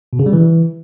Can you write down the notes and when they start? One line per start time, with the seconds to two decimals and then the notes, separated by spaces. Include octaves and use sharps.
0.13 B2
0.19 C#3
0.26 G3
0.33 E3